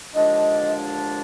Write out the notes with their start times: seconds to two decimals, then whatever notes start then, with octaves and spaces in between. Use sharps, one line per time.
0.15 D#2 D3 F3 G#3 D4 D#5